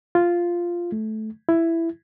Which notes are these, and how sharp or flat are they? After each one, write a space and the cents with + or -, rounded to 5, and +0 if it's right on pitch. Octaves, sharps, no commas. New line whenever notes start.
F4 -5
A3 -15
E4 +10